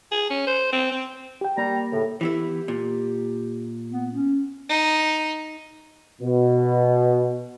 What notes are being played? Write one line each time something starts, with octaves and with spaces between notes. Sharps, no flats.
G#4
C#4
C5
C4
C4
G4 G5
G3 A#3 A#5
A2 C#3
E3 B3 E4 G4
A#2
B3
C#4
D#4
B2